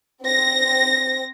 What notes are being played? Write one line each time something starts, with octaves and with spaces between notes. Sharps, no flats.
C4 A#6